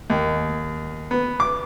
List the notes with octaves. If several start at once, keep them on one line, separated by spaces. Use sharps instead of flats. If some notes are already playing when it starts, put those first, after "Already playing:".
D#2
B3
D6